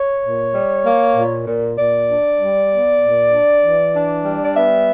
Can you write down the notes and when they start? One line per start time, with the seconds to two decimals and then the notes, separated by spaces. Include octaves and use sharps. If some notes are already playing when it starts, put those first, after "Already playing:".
Already playing: C#5
0.24 A#2
0.55 G3
0.85 A#3
1.16 A#2
1.48 A#2
1.78 A#2 D5
2.09 D4
2.40 G3
2.71 B3
3.02 A#2
3.32 D4
3.64 E3
3.94 D4
4.25 G3
4.45 D5
4.56 B3 E5